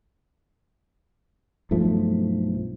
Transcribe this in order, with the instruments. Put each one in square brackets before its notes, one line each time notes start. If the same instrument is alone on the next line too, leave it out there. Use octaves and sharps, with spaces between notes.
[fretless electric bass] B1 G2 F3 A3